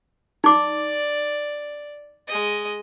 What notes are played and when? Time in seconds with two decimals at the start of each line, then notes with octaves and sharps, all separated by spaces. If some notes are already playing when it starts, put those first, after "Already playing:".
0.44 D#4 D5 D6
2.27 G#3 D#5